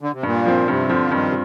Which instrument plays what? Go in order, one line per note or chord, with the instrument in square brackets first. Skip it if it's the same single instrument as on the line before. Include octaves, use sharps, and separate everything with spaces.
[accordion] D3
C3
[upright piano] G2 [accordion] A#2
[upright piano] F3 C4
[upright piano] G2 [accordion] C3
[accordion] D3 [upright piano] F3 C4
[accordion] F3
[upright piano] G2 [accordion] D#3
[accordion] C3